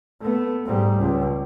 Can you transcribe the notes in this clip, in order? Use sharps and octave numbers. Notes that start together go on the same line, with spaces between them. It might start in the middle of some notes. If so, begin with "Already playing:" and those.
A3 B3
G#2 G3
C#2